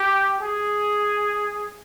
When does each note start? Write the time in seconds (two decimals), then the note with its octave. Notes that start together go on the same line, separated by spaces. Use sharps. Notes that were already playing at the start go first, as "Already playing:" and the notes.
Already playing: G4
0.40 G#4